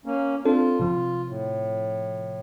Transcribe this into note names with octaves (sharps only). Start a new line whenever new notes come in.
A#3 C#4
C4 D4 F4 A4
C3 F3
A2